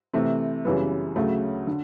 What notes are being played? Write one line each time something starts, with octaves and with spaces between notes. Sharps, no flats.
C3 E3 A3 C4
F#2 C#3 E3 G3 B3
D2 C#3 F#3 A3
D3